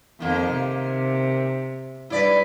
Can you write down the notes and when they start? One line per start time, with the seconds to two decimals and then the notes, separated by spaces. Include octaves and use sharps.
0.20 F2 D#3 A#3
0.52 C3
2.10 G2 E4 B4 D5